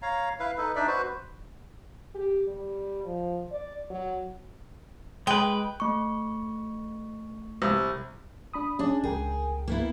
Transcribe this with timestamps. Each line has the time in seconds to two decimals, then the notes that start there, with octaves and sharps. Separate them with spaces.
0.02 C#5 F5 A#5
0.40 E4 B4 F5
0.58 D#4 A4 B4
0.76 D4 D#4 D5 E5
0.87 F#4 B4 C5
2.15 G4
2.48 G3
3.04 F3
3.51 D5
3.90 F#3
5.27 G#3 B4 G5
5.80 A3 C#6
7.62 C2
8.53 D4 B5 D#6
8.79 C#4 D4 G#4 D5
9.04 C#2 G#4 A#4 G5
9.68 A#3 B3 E4